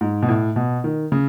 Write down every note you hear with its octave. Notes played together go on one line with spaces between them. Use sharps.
G#2
B2
A2
B2
D#3
C#3